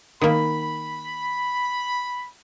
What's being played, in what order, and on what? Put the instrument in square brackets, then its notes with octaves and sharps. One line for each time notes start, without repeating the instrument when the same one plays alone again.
[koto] D#3 A#3 [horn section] B5